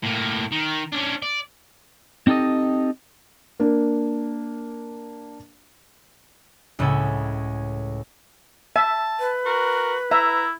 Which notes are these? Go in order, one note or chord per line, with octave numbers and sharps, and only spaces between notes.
A2 A#3
D#3
C#4 D4
D5
C4 D#4 G4 A4 D#5
A#3 D4
C#2 A2 C#3 C#4 A4 G#6
E5 A5
B4
F#4 A#4
E4 E5 A#5